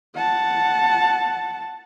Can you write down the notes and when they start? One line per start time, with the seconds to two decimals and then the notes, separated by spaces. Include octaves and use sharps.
0.16 F#5 A5